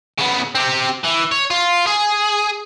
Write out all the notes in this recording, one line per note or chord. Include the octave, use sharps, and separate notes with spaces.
C#3 B3
C4 G4
E3
C#5
F4
G#4